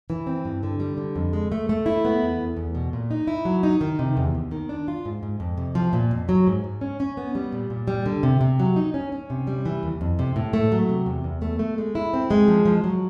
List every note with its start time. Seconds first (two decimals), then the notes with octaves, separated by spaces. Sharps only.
0.10 E3
0.27 C4
0.45 G2
0.63 D3
0.80 G3
0.97 D3
1.16 F2
1.33 G#3
1.52 A3
1.69 A3
1.86 E4
2.05 B3
2.22 E2
2.40 E2
2.57 E2
2.75 B2
2.93 A#2
3.11 D#4
3.27 E4
3.45 F#3
3.63 D#4
3.81 D#3
3.99 C3
4.17 E2
4.35 D#2
4.51 D#3
4.69 D4
4.88 F4
5.05 G#2
5.23 G#2
5.40 F2
5.58 C3
5.75 F3
5.93 A#2
6.11 F2
6.29 F#3
6.47 G#2
6.64 G#2
6.81 C#4
7.00 C#4
7.17 B3
7.35 G3
7.52 A#2
7.70 A#2
7.88 G3
8.06 D3
8.23 C3
8.41 C3
8.60 F#3
8.76 D#4
8.94 C#4
9.12 C#4
9.30 C3
9.47 G3
9.66 E3
9.83 D#2
10.01 F2
10.19 C3
10.36 A2
10.53 A3
10.72 F#3
10.89 C3
11.06 E2
11.24 E2
11.42 A3
11.59 A3
11.78 G#3
11.95 E4
12.13 C4
12.31 G#3
12.48 F3
12.66 F3
12.84 F#3